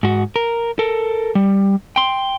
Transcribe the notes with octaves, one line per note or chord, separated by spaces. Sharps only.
G#2 F#4
A#4
A4 A#4
G3
G5 C6